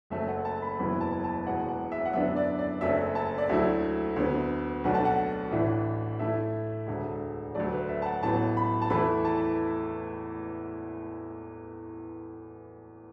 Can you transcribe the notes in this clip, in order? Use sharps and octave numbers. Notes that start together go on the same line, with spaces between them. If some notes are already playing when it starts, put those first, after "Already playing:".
F#1 F#2 F#3 A3 E5
F#5
A5
B5
F#1 E2 B2 B3 E4 B5
A5
A5
E1 E2 B2 F#5
F#5
E5
F#5
F#2 D3 B3 D4 E5
D5
D5
F#1 F#2 F#3 A3 E5
A5
D5
D2 D3 F#3 A3 E4 E5
D2 D3 B3
B1 B2 A3 D4 F#5
A5
F#5
A1 A2 E3 D4 E5
A2 A3 E4 E5
E1 D2 D3 A3 D4
D2 D3 F#3 A3 D5
B4
E5
A5
F#5
A1 A2 F#3 B3 A5
B5
A5
E2 E3 A3 E4 B5
A5